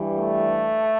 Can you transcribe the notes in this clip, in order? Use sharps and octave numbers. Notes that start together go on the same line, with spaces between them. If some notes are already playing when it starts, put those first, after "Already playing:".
Already playing: G2 E3 G3
A3